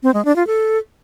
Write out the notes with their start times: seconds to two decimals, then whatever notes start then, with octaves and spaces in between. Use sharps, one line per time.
0.03 C4
0.14 G#3
0.25 D4
0.36 F4
0.47 A4